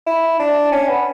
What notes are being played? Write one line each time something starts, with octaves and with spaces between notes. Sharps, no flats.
E4
D4
C#4
B3